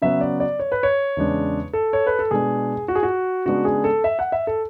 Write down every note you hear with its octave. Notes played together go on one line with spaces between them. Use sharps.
C#3 F#3 B3 E5
D5
D5
C#5
B4
C#5
E2 C#3 G#3 D4
A4
C#5
B4
A4
B2 G#3 D4 G#4
F#4
G#4
F#4
C#3 G#3 B3 D4 F#4
G#4
A4
E5
F#5
E5
A4